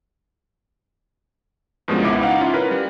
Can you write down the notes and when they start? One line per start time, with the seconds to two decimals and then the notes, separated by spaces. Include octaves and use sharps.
1.88 G2 B2 F3 G#3 A#3 C#4
2.02 C#2 B3 E4 D6
2.22 D#4 F5 F#5
2.41 C#4 E4 F4
2.54 A#4 B4
2.71 G3